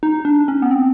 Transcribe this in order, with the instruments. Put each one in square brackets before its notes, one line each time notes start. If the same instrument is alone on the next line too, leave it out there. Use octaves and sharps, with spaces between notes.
[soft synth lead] D#4
D4
C#4
B3
C4